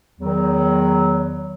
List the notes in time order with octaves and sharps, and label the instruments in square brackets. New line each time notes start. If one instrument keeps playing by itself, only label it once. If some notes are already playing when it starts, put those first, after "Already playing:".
[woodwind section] E2 D#3 F#3